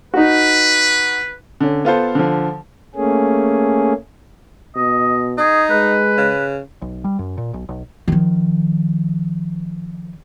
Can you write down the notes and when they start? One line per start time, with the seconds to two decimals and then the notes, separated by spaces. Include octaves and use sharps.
0.14 D#4 F#4 B4
1.60 D3 C#4
1.85 B3 F4 A4 C5
2.15 D3 F3
2.95 A3 A#3 C#4 G#4
4.76 B2 D#5
5.38 D#4 G#4
5.70 G#3 B4
6.18 C#3
6.82 B1
7.04 G3
7.19 F#2
7.38 A#2
7.54 B1
7.69 B1
8.08 D#3 F3